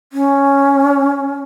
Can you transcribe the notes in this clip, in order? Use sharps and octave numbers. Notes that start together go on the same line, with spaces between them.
C#4